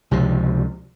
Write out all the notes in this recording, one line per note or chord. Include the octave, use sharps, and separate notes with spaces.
C#2 C3 F3